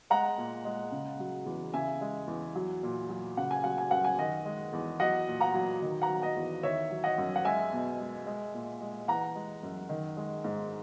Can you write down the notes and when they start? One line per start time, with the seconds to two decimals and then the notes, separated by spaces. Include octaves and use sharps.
0.10 G#3 F#5 A#5
0.38 A#2
0.65 G#3
0.92 C#3
1.19 F#3
1.46 E2
1.73 C#3 E5 G#5
2.01 G#3
2.27 E2
2.55 F#3
2.83 A#2
3.09 F#3
3.37 C#3 F#5
3.51 G#5
3.64 F#3 F#5
3.78 G#5
3.91 F#2 F#5
4.04 G#5
4.18 D#3 D#5 F#5
4.45 G#3
4.73 E2
5.00 F#3 D#5 F#5
5.28 A#2
5.40 F#5 A#5
5.54 F#3
5.82 D#3
6.02 F#5 A#5
6.08 F#3
6.22 D#5 F#5
6.36 E2
6.63 D#3 C#5 E5
6.91 F#3
7.04 D#5 F#5
7.18 F#2
7.36 F#5
7.44 G#3 E5 G#5
7.72 B2
8.00 G#3
8.26 G#3
8.54 A#2
8.81 G#3
9.08 E3 F#5 A#5
9.35 G#3
9.63 F#2
9.89 D#3
10.17 G#3
10.44 G#2